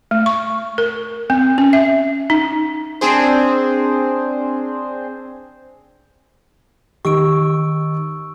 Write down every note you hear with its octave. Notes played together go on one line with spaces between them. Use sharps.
A3
C#6
A#4
C4
C#4
E5
D#4
C4 D4 G#4 C5
D#3 G4 C#6 E6 D7